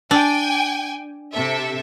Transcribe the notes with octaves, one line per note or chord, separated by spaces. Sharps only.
D4 G5 G#5
C3 A4 E5